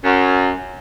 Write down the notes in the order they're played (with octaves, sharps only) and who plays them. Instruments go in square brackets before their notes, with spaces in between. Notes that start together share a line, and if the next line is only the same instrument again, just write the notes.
[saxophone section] F#2